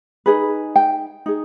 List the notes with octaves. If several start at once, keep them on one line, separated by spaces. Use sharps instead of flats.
D#4 G#4 B4
G5
D#4 G#4